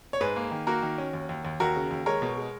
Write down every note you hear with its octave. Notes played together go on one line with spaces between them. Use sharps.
C#5
G#2 G#4 B4
A#3
D#3
A#3 F#4 A#4
D#3
C#4
D#2
D#2
D#2
D#2 F#4 A#4
C#3
D#2
G#3 A#4 C#5
B2
G#3